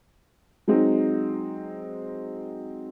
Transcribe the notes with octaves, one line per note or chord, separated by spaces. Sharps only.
F#3 G#3 C4 D#4